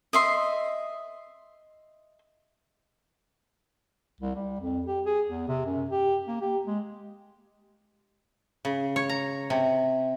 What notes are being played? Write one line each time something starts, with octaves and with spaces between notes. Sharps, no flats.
D#5 E5 C6
C2
G3
F2
G4
G#4
E2
C3
F#2
G4
A#3
G4
G#3
C#3
C#5
A#5
C3